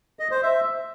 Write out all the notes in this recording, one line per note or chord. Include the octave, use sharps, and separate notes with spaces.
D#5
C5
E5